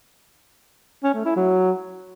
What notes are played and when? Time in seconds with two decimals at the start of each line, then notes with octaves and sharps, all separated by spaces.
1.03 C#4
1.14 A3
1.25 E4
1.36 F#3